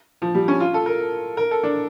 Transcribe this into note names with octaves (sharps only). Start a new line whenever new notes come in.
F3
G3
C#4
F4
A4
A#4
A#4
A4
D4